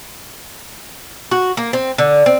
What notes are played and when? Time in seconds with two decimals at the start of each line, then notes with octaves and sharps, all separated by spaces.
1.31 F#4
1.57 A#3
1.73 C4
1.98 D3
2.26 C4